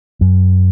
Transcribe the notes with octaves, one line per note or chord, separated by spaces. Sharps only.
F#2